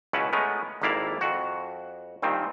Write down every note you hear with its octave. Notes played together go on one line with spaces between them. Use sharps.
C#2 B2 C#4 E4 B4 F#5
G#3 A3 B3 C#4 A#4
G#1 F2 A#3 E4 D5 F5
F2 F#4
G2 A#2 D#3 C4